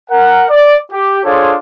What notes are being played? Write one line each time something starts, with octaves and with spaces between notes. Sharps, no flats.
A#4 F#5
D5
G4
D4 F4 G#4 A4 C5 C#5